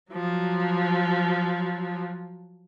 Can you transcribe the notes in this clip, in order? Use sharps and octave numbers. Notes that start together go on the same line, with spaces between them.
F3 F#3